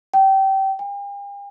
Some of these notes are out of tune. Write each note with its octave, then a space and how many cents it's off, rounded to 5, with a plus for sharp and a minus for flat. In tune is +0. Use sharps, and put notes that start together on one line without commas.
G5 -25
G5 +45